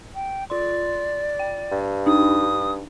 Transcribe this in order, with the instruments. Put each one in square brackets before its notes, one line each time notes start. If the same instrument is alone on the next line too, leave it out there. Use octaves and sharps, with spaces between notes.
[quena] G5
[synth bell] F4 C6 [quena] D5
[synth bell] G5
[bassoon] G2
[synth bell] D4 D#4 [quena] D#6